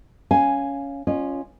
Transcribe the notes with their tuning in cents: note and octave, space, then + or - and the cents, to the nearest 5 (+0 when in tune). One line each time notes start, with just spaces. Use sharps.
C#4 +10 F5 +0 G#5 +0
C#4 +0 F4 +0 D#5 -30